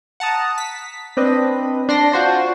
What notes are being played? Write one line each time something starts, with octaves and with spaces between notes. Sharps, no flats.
F#5 A5 A#5 D#6
B6
C4 D4 B4 D#5
D4 C6 A#6
F4 F#4 C5 D5